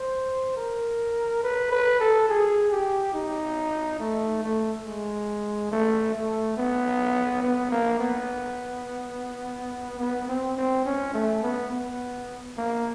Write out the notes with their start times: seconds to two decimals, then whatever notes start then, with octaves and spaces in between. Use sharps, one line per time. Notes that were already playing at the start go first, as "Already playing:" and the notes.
Already playing: C5
0.57 A#4
1.43 B4
1.71 B4
2.00 A4
2.29 G#4
2.71 G4
3.14 D#4
4.00 A3
4.43 A3
4.85 G#3
5.71 A3
6.14 A3
6.57 B3
7.42 B3
7.71 A#3
7.99 B3
9.99 B3
10.28 C4
10.57 C4
10.85 C#4
11.14 A3
11.43 B3
11.71 B3
12.57 A#3